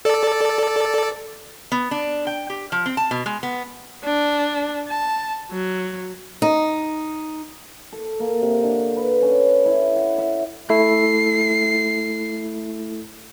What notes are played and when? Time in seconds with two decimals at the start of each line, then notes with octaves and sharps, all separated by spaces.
0.05 A4 D5
1.72 B3
1.91 D4
2.27 G5
2.50 G4
2.72 F3
2.86 C4
2.97 A5
3.11 B2
3.26 G#3
3.43 B3
4.05 D4
4.89 A5
5.51 F#3
6.42 D#4
7.92 A4
8.20 A#3
8.42 C3
8.64 D3
8.96 B4
9.22 C#4
9.65 E4
9.96 F#5
10.18 E5
10.70 A3 E4 A4 C7